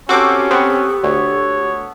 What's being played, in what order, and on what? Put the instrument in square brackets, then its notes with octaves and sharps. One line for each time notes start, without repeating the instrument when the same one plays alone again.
[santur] C4 A4 C5 [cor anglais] C#4 [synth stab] F#4 D6 [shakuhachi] G4
[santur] B3 C#6 [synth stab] C4
[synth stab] D2 [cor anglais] C#5